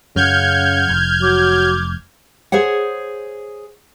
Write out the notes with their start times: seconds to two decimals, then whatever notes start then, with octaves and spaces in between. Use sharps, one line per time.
0.16 F#2 C#3 F#5 F6 G6 G#6
0.89 F1
1.22 F#3 D6
2.52 G#4 C5 C#5 F#5